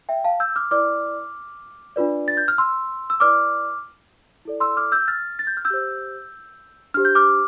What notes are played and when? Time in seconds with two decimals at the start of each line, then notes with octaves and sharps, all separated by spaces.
0.09 E5 G5
0.24 F5 A5
0.40 E6 G6
0.55 D6 F6
0.71 E4 B4 D5 D6 F6
1.96 D4 F4 B4 D5
2.28 A6
2.37 G6
2.48 F6
2.58 C6 E6
3.10 E6
3.20 E4 B4 D5 D6 F6
4.45 E4 A4 D5
4.60 C6 E6
4.76 D6 F6
4.92 E6 G6
5.08 F6 A6
5.39 A6
5.47 G6
5.57 F6
5.65 E6 G6
5.70 G4 C5
6.94 D4 G4 C5 F6
7.05 G6
7.15 D6 F6